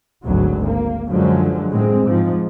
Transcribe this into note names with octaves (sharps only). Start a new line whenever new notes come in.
G#1 D2 F#3
A#3
F#2 D3 F3 F#3 G#3
A2 G#3 C4
G#2 F3